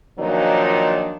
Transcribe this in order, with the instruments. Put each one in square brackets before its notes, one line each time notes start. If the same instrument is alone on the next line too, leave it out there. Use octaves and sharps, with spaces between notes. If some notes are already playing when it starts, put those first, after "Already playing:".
[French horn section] A#2 D#3 F3 F#3 D4 D#4